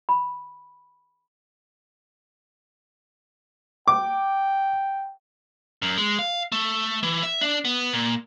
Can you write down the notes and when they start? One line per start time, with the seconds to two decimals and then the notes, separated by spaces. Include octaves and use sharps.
0.09 B5
3.88 G5 D6
5.82 F#2
5.97 G#3
6.19 F5
6.52 A3
7.03 E3
7.23 E5
7.41 D4
7.65 B3
7.93 A#2